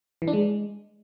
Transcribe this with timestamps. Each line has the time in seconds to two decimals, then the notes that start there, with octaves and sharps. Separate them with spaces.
0.22 E3
0.28 D4
0.33 G#3